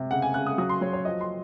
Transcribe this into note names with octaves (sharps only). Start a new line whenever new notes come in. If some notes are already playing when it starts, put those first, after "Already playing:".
Already playing: C3
C#3 F#5
G#5
C#3 F#6
D#6
F#3 D#6
C6
F#3 C#5
C#5
F3 D#5
C6